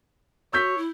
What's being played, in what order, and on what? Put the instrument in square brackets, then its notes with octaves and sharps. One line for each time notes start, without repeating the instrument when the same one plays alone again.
[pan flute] F#4 [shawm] C#5 [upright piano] E6 G6 B6
[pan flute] E4